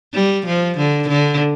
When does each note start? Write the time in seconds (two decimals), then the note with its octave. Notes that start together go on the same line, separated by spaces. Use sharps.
0.14 G3
0.46 F3
0.77 D3
1.09 D3